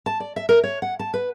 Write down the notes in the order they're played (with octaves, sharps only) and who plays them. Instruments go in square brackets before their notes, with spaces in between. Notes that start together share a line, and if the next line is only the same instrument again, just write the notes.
[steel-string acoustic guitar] A5
D5
E5
A#4
C#5
F#5
A5
B4